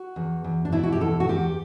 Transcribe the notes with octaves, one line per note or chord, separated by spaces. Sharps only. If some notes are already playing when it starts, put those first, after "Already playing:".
Already playing: F#4
E2
E2
D4
B2 E4
F#4
G4
E2 A4
F#4
E2 G4